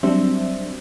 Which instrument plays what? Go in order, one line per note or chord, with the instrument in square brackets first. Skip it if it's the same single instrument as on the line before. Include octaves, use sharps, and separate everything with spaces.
[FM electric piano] F#3 G3 C4 D4 C5 E5